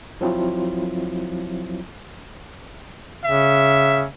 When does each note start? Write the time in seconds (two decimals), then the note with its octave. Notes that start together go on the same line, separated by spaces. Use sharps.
0.21 F3 F#3 C4 E4 F4
3.24 C#3 E5